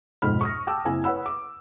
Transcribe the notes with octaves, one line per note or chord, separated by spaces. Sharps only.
B1 F2 G#2 G#3 B5 F6
C#6 D#6 A#6
G5 A5 D6 E6
F#1 C4 E4 G#5
B4 C#5 F#5 B5 E6
D6